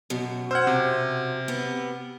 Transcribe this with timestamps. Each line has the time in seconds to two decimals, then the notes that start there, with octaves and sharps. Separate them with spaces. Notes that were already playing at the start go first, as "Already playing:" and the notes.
0.10 F#2 B2 F#3
0.51 C5 F#5 E6 F6 G#6
0.67 C3
1.48 B3 G4